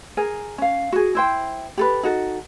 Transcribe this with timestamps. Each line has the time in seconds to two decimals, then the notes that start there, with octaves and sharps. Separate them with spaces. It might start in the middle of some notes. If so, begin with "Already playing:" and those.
0.17 G#4 A#4 G#5
0.58 C#4 F5
0.92 F#4 G#4
1.15 E4 C5 G5
1.77 G4 A4 B4
2.03 D#4 F#4 A4